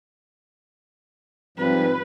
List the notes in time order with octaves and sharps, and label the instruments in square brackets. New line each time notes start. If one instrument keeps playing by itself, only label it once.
[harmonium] G#2 F3 G3 [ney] C4 [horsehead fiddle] B4